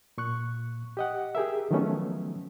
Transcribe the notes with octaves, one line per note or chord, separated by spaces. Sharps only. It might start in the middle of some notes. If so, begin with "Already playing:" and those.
A#2 C#6 F#6
G4 D#5 F#5
G4 G#4 A#4 E5
D#3 F3 F#3 A3 B3 C#4